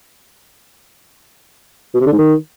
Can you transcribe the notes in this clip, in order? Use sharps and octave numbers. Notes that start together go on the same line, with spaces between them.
B2
C3
D3
G#2
D#3